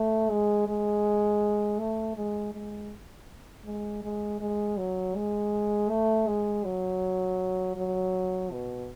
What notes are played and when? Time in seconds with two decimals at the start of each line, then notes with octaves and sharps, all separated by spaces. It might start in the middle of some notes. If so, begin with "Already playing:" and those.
Already playing: A3
0.30 G#3
0.67 G#3
1.79 A3
2.17 G#3
2.54 G#3
3.66 G#3
4.03 G#3
4.40 G#3
4.77 F#3
5.15 G#3
5.89 A3
6.27 G#3
6.65 F#3
7.76 F#3
8.51 B2